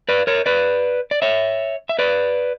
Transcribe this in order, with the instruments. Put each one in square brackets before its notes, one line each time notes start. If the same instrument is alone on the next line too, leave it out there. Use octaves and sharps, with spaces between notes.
[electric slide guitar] B4 D5
A#4 C#5
B4 D5
D5
C#5 E5
E5
B4 D5